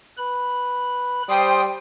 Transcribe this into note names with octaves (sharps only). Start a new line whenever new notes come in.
B4 B5
G3 C5 G5 C6 D#6